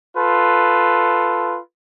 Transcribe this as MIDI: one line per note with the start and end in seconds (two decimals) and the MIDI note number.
0.16 1.58 65
0.16 1.58 69
0.16 1.58 71